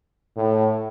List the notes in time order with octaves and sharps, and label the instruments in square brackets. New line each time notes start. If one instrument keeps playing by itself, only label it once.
[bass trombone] A2